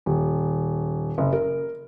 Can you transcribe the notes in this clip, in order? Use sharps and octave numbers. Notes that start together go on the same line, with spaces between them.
D#1
F#1
A#4